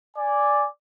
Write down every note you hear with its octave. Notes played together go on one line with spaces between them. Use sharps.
D5 G#5